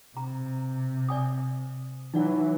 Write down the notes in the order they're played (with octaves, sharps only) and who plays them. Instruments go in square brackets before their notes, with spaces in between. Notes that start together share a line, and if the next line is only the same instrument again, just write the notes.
[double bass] C3 [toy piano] A#5
[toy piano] D5 G#5 D#6
[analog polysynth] E3 F#3 [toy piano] D#4 D5 F#5